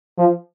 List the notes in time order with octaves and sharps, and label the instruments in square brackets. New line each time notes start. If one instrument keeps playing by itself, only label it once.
[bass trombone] F3